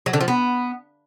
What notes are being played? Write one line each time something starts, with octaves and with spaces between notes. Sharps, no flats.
F#3
D3
F3
B3